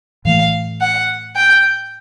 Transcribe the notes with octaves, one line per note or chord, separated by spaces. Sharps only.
A2 E3 A3 F5
F#5
G5